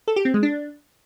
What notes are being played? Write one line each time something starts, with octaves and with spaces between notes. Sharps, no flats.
A4
G4
C4
G#3
D4